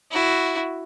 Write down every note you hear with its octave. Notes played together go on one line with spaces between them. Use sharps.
E4 F#4